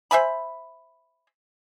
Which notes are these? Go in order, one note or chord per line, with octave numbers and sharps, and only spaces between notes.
C5 E5 G#5 B5